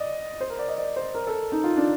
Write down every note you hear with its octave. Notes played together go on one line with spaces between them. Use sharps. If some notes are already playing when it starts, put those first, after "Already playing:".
Already playing: D5 D#5
C5
A#4
D5
D#5
D5
C5
A#4
A4
D#4
F4
D4